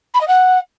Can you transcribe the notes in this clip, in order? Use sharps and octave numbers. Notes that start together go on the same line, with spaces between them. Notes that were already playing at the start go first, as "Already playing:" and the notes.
B5
D#5
F#5